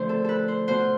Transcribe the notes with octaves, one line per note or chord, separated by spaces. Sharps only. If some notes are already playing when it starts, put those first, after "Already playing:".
Already playing: D3 F3 A3 C4 C5
A4
A4 B4
C5
B2 B3 C5